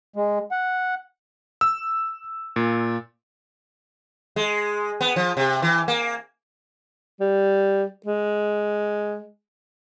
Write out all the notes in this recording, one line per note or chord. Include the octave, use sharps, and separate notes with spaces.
G#3
F#5
E6
A#2
G#3
B3
F3
C3
E3
A#3
G3
G#3